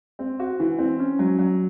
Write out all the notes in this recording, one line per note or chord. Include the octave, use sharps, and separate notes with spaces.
C4
F#4
E3
C4
C#4
F#3
F#3